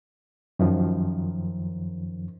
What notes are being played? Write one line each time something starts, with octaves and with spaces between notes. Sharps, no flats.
F#2 D#3 F3